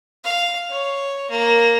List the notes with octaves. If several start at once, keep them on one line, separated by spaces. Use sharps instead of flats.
F5
C#5
A#3